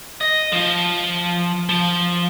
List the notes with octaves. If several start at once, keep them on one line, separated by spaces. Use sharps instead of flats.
D#5
F3 F4
F3